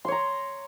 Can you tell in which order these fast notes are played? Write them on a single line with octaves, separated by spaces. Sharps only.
C6 C#5 A#5